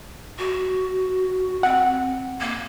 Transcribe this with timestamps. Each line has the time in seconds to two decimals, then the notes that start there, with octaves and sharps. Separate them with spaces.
0.39 F#4
1.63 C4 F#5
2.40 A#3